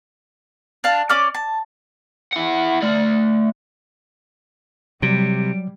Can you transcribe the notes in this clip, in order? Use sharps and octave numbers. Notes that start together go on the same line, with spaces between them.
D4 F5 A5
C#4 D5 D6 F6
A5
E4 F#5
A3 D5
C3 F#3 G3 D7